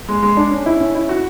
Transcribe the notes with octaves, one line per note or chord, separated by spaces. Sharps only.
G#3
G#3
D4
C#4
E4
C#4
E4
F#4